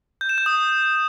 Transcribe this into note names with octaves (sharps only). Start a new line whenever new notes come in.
G6
E7
G6
D#6